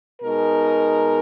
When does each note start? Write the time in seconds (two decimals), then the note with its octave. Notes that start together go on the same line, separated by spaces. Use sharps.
0.22 B2 G#3 D#4 A#4